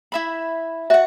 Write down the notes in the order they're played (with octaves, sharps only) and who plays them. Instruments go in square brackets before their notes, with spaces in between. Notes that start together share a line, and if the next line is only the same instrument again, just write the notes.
[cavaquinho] E4 E5 B5
[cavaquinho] F#4 F#5 [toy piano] E5